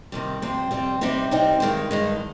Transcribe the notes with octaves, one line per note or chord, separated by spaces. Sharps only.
C3 D#3 G3
F2 C3 G3 C4
F2 C3 G3 C4
C3 G3 C4 D#4
C3 G3 C4 D#4
G2 D#3 G#3
G2 D#3 G#3